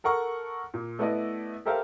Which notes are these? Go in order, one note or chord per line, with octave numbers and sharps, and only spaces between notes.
A4 A#4 F#5 C#6
A#2
A3 B3 E4 B4 D5 D#5
G4 A4 A#4 C5 E5 F5